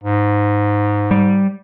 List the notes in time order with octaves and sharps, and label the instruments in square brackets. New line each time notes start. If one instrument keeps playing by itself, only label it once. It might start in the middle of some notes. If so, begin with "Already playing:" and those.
[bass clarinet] G#2
[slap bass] G3